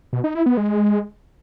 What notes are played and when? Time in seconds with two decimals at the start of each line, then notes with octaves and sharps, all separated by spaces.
0.13 B2
0.24 D#4
0.35 E4
0.46 B3
0.57 G#3